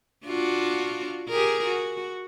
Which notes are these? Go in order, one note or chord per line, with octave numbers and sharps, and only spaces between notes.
D4 F4 F#4
G4 G#4 A#4
F#4